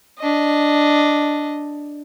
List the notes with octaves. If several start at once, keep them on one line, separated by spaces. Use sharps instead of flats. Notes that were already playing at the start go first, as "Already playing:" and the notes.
D4 D#5